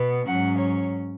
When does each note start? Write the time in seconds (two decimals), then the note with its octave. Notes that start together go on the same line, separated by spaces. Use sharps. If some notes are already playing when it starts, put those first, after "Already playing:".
Already playing: B2 B3
0.26 G#2 F#3 C#4 F#5
0.58 C#5